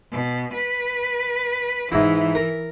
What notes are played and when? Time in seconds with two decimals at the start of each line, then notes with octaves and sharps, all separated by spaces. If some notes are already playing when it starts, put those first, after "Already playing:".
0.12 B2
0.53 B4
1.92 G#2 E3 E4
2.35 A#4